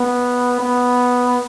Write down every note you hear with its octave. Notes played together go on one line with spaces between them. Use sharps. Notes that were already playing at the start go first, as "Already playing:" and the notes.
Already playing: B3
B3